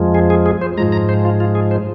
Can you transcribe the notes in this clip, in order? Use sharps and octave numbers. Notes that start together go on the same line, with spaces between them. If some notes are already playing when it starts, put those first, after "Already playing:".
Already playing: F2 F3 G#3
G#4
G#4
G#4
C5
G#2 F3 G#3 A#5
A#5
C5
F4
F4
G#4
C5